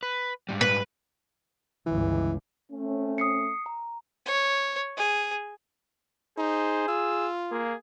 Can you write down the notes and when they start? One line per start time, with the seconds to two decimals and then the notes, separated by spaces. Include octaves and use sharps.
0.03 B4
0.49 G#2 C3 G3
0.61 B4
1.86 G1 C#2 E3
2.71 A3 C4 C#4
3.18 D#6 C7 C#7
3.66 A#5
4.26 C#5
4.97 G#4
6.38 D#4 G#4 C5
6.88 F4 E6
7.52 A#3 G#4